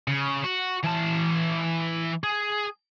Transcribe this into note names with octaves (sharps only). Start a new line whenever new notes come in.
C#3
F#4
E3 A5
G#4